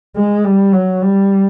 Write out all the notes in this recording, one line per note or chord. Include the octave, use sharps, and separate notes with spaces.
G#3
G3
F#3
G3